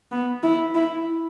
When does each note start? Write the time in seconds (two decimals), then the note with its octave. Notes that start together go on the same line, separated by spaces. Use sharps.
0.12 B3
0.43 E4
0.75 E4